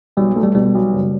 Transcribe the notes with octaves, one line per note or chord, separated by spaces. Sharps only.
B1 G3
A3
G3
B2 G3
B1
F#1